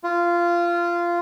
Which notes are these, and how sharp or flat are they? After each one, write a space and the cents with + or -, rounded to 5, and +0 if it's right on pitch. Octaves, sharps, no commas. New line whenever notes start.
F4 -15